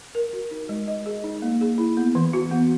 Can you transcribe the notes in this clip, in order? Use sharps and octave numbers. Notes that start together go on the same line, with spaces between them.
A#4
F#4
D#4
G#3
D#5
G#4
D#4
A#3
G#4
E4
B3
E3
F#4
B3